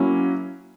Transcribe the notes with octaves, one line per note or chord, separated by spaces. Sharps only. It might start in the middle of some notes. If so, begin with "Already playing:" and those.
Already playing: F#3 A#3 C#4 E4